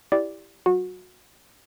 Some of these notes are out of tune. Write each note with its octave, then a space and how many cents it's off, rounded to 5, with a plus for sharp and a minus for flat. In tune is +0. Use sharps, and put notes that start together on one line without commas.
E4 +0 G4 +0 D5 -5
F#3 +25 F#4 -25